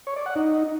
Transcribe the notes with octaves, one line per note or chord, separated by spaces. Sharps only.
C#5
D5
F#5
D#4